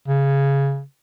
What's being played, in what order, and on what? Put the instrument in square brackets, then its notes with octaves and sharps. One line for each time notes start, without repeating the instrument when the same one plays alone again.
[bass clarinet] C#3